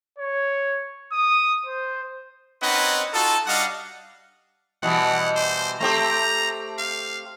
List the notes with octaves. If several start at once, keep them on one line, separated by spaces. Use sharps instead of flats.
C#5
D#6
C5
C4 C#4 D#4 B4 D#5 F#5
D#4 F4 F#4 A4
G3 D4 D#5 F5 F#5
B2 E3 G3 F#5
C5
A3 C4 G4 A#5
F5